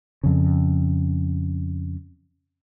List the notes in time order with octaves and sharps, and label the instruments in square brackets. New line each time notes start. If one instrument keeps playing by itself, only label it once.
[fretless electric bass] F2 C#3